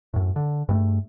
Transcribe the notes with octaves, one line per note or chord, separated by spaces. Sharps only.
F#2 A2
D3
G2 G#3 A3